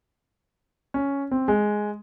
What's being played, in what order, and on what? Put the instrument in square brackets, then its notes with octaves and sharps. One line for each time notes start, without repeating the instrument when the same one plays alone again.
[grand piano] C#4
C4
G#3